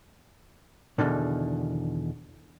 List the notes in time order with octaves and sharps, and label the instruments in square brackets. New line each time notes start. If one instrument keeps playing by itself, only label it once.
[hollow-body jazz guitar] E2 B2 D3 D#3